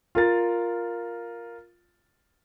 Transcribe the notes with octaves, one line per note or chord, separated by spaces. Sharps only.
F4 A#4 A6